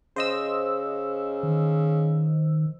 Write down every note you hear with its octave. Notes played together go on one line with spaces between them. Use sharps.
C#3 C5 D#5 E6
D#3